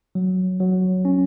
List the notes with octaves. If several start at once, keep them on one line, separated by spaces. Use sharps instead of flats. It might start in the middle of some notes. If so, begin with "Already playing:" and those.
F#3
F#3
C#4